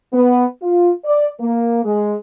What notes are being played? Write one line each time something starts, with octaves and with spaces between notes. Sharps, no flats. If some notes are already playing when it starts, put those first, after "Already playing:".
B3
F4
D5
A#3
G#3